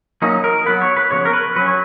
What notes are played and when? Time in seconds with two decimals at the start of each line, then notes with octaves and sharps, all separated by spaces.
0.22 F#3 A#3 C#4 D#4
0.44 A#4
0.66 F#3 B3 B4
0.82 C#5
0.96 B4
1.11 C#3 F3 B3 C#5
1.25 A#4
1.33 B4
1.56 F#3 C#4 B4
1.66 C#5